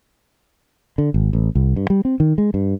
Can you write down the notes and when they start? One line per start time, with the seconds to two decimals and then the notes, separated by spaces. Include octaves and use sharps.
0.98 D3
1.14 G#1
1.33 A1
1.55 C2
1.76 G2
1.90 G3
2.05 C4
2.20 D#3
2.38 G#3
2.54 G2